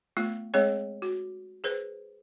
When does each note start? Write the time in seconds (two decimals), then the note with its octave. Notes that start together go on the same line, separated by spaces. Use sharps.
0.17 A3 B3 F4
0.54 G#3 C4 G#4 C#5 F5
1.02 F#4
1.64 G#4 B4 C5